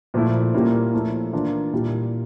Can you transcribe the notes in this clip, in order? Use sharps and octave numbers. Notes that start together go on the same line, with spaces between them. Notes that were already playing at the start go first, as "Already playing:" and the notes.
A#2 F3 A3 E4
A#2 G3 A#3 C#4 E4
F3 A3 E4
E3 A#3 D4 F4
A#2 G3 A#3 E4